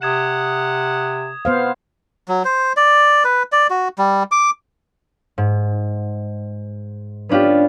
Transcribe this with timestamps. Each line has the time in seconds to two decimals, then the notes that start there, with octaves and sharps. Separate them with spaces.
0.02 C3 F#5 D#6 G#6 E7
1.45 B3 C5 F5
2.28 F#3
2.45 C5
2.77 D5
3.24 B4
3.52 D5
3.70 F#4
3.98 G3
4.32 D6
5.38 G#2
7.29 B3 C#4 D4 F4 G4